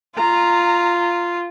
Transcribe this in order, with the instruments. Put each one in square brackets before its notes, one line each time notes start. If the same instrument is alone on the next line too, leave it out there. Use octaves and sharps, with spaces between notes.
[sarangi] F4 [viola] A#5